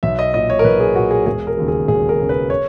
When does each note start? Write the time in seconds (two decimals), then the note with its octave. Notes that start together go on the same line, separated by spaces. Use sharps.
0.03 B1 E5
0.19 D#5
0.34 A#2 D#5
0.50 C#5
0.59 A#4
0.64 B1 B4
0.80 G#4
0.95 A#2 F#4
1.11 G#4
1.26 E1 G#4
1.47 A#4
1.58 D#2 C#3
1.68 G#4
1.88 E1 G#4
2.09 A#4
2.19 D#2 C#3
2.29 B4
2.50 C#5